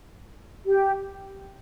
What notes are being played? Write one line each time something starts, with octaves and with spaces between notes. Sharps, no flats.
G4